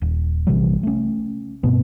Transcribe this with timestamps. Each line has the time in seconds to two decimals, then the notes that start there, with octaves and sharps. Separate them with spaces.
0.02 D#1
0.47 A#1 C3 E3 G3
0.83 A3 C#4
1.63 G2 B2 B3 C4